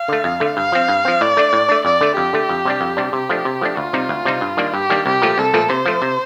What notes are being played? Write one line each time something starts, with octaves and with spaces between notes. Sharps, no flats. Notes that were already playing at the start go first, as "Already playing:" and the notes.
Already playing: F5
D3 A3
F2
D3 A3
G2 F5
F3 C4
G2
F3 C4
A2 D5
A3 D4
A2
A3 D4
F2 D5
D3 A3
F2 G4
D3 A3
F2
C3 G3 D4
F2
C3 G3 D4
C3 G4
F3 A3 D4
C3
F3 A3 D4
D2 F4
C3 G3 C4 D#4
D2
C3 G3 C4 D#4
G2
D#3 G3 A#3 D4
G2 G4
D#3 G3 A#3 D4
C2 G4
A#2 F3 A3
C2 A4
A#2 F3 A3
C3 C5
F3 A3
C3